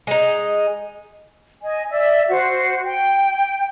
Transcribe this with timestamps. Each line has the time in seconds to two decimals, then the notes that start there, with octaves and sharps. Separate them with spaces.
0.07 G#3 D#4
1.62 D#5 G#5
1.90 D5 E5
2.29 F#4 C5
2.84 G5